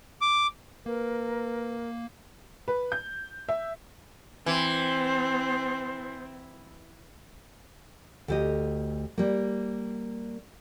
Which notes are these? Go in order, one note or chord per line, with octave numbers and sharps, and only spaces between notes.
D6
A#3 A#4 B4
B4
G6
E5
E3 C4 C5
D2 G4 D#5
G3 A#3